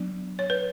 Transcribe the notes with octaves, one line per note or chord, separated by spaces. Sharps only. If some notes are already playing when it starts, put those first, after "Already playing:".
Already playing: F#3 B3 D4
C#5
B4